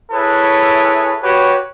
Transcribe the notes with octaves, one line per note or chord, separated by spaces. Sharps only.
E4 G#4 A4 B4 C#5
F#4 G4 B4 C#5